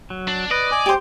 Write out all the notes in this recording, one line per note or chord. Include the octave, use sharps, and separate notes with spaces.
F#3
D4
B4 D5 D#5
G#5 D6
G4 C5